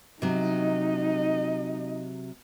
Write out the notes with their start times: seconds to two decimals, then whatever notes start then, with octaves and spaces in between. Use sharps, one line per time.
0.22 C3 F#3 D#4 D#5